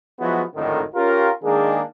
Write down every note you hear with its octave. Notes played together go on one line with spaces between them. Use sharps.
F3 F#3 G#3 B3 E4 F#4
G#1 F2 A2 D3 D#3
C#4 F4 G4 A#4
D#3 G#3 A#3 D4 D#4 G#4